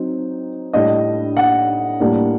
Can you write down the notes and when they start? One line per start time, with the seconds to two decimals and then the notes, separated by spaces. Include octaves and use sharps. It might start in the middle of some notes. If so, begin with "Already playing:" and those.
Already playing: F#3 C4 D#4
0.73 A2 G3 D4 D#5
1.37 F#5
2.00 A2 G3 A#3 D4